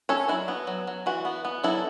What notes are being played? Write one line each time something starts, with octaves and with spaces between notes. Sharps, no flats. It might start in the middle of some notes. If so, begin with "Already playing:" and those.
C#4 A4 C#5
F#3 E4
B3
F#3
F#3
E3 F#4
B3
B3
F#3 E4 A4